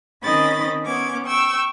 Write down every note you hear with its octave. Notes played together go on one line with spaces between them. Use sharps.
D#3 C4 C#4 D#5 B5 A6
B3 C#4 D6 G#6
G5 C#6 E6